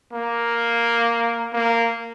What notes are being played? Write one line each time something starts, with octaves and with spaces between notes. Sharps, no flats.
A#3
A#3